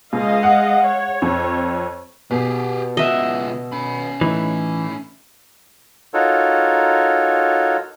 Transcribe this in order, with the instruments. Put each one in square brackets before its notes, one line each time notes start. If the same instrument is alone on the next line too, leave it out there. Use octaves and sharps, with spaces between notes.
[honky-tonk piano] C#2 [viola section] G#3 D#5 F5
[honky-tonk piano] F#5
[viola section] C#5
[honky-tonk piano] F2
[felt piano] B2 [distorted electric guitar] G4 G#4
[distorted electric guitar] C#2 F#5 [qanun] D#5 E5
[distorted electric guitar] C#4 B5
[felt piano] A2 D#4 [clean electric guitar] E3
[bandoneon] D#4 F4 F#4 A4 A#4 C#5